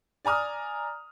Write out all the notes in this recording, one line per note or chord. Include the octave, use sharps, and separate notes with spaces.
D5 G#5 A#5 D#6 F6